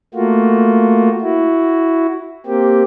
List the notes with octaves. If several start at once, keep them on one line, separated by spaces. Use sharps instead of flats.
A3 A#3 F4 F#4
E4 F#4
A#3 C4 G4